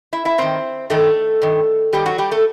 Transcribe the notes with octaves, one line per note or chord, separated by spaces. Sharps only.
E4 E5
E4 E5
G2 D#3 C4 C5
G2 D#3 A3 A4
G2 D#3
G2 D#3 G3 G4
F#3 F#4
G3 G4
A3 A4